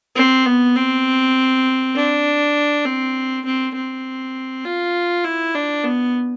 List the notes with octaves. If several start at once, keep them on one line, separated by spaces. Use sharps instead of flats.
C4
B3
C4
D4
C4
C4
C4
F4
E4
D4
B3